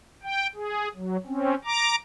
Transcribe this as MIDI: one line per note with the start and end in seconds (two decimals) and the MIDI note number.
0.23 0.47 79
0.55 0.88 68
0.94 1.17 54
1.26 1.54 60
1.26 1.54 61
1.65 1.95 82
1.65 1.95 86